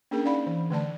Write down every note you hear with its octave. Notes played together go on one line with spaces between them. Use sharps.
A#3 C#4 D4 G#4 A#4 G5
C#4 D#4 D5 F5 F#5 B5
E3
D3 A3 D5 A5